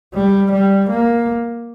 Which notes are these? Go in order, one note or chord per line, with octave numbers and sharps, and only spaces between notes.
G3
G3
A#3